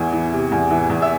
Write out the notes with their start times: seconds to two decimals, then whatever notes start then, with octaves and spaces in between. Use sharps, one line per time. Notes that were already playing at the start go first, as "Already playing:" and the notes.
Already playing: E2 E3
0.12 E3
0.32 C3
0.51 E2
0.71 E3
0.90 E2
1.02 E5